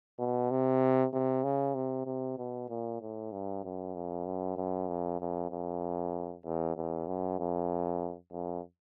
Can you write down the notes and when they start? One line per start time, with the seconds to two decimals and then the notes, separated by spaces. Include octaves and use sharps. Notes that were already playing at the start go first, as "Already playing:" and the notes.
0.19 B2
0.51 C3
1.13 C3
1.44 C#3
1.75 C3
2.06 C3
2.38 B2
2.69 A#2
3.01 A2
3.32 G2
3.64 F#2
3.95 F2
4.26 F#2
4.57 F#2
4.88 F2
5.20 F2
5.51 F2
6.45 E2
6.77 E2
7.07 F#2
7.39 F2
8.32 F2